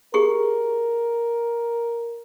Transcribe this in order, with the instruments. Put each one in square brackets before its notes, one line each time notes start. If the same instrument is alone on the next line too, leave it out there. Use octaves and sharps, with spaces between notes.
[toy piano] G4 G#4 C#6 [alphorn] A#4